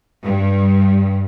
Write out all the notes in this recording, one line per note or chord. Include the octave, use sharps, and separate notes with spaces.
G2